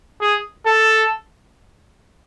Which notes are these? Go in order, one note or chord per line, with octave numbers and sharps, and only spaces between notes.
G#4
A4